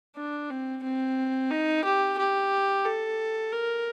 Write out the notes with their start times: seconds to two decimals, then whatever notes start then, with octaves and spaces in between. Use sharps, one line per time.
0.17 D4
0.50 C4
0.83 C4
1.51 D#4
1.84 G4
2.18 G4
2.85 A4
3.53 A#4